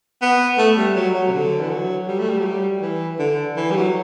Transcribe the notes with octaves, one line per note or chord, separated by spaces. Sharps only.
B3
A3
G3
F#3
F#3
C3
D3
E3
F#3
G3
A3
G3
F#3
G3
E3
D3
E3
G3
F#3